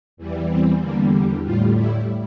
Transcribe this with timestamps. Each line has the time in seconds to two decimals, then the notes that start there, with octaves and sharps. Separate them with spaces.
0.17 E2 E3 G3
0.49 C4
0.81 E2 D3 G3 A#3
1.45 A2 G3 F4
1.77 E4